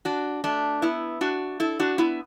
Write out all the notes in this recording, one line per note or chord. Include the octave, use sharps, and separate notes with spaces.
D4 F#4
A3 D4
B3 E4
D4 F#4
E4 A4
D4 F#4
B3 E4